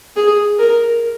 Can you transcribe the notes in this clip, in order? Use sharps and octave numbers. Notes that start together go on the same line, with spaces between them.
G#4
A#4